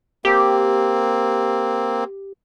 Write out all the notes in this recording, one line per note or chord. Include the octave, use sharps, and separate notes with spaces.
A#3 C4 G4